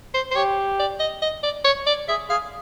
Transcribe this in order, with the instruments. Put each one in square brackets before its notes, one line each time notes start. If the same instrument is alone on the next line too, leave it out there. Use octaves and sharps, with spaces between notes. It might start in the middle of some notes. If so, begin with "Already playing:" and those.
[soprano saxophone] C5
C5
[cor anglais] G4 [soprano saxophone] C#5
[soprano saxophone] D5
D#5
D#5
D5
C#5
D5
[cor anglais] G#4 [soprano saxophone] E5
[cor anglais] G#4 [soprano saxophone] F5